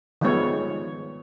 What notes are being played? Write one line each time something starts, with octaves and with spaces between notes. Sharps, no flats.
D#3 F3 G3 G#3 B3 C#5